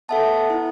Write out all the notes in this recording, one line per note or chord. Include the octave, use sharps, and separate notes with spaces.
B3 A4 E5 A5
E4